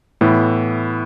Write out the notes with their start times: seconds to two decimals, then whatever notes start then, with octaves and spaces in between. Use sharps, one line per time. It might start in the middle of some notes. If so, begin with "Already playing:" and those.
0.21 A2 E3 B3 E4